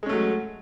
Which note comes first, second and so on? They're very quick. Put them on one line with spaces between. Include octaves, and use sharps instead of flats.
G#3 C#4 A3 F#3